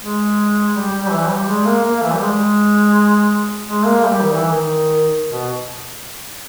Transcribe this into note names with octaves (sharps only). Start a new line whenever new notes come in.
G#3
G3
G3
E3
G3
G#3
A#3
A#3
E3
G3
G#3
G#3
A#3
G3
D#3
E3
D#3
B2